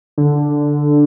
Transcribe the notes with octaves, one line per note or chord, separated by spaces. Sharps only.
D3